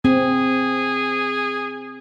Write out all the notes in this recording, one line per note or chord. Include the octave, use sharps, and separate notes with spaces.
C4 G#4